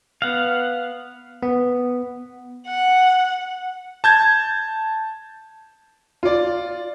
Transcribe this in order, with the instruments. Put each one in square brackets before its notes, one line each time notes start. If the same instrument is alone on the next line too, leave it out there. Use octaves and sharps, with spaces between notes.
[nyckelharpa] B3 [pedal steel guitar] F5 F#5
[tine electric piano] B3
[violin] F#5
[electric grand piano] A5 G6 G#6
[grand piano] F4 D5